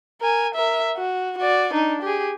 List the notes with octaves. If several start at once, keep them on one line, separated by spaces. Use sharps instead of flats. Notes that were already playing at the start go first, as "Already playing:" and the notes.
A#4 G#5
A#4 E5
F#4
F#4 D5
D4 D#4
G4 G#4